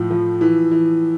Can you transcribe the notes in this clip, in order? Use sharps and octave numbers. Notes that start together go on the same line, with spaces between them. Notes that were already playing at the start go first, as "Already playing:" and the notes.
Already playing: A2 F3
F3
E3
E3